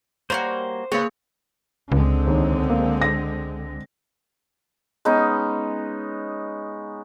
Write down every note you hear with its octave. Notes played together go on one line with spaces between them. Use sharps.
G3 A#3 F4 F#4 C5 C#5
C#3 A#3 B3 G#4 C#5
C#2 D3 G#3 C4
D#2
A#3
A#6
G#3 B3 C#4 D#4